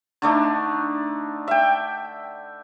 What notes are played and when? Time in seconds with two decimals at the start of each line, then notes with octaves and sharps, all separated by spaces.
0.22 D3 A3 D4 D#4
1.48 E5 G5